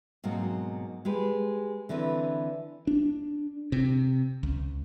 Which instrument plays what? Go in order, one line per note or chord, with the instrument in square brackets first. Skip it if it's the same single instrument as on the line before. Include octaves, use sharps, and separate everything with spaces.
[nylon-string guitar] G#2 B2 F#3 A#3 C4
G#3 G4 B4
D3 E3 C4 B4
[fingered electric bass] D4
C3
C#2